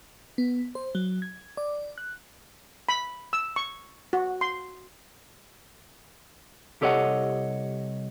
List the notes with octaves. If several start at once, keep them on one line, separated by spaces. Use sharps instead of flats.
B3
C5
F#3
G#6
D5
F#6
B5
E6
C#6
F#4
C6
C2 G4 A4 C#5 D#5 F#5